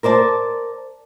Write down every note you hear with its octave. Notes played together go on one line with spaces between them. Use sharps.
A#4 C5 D5 A5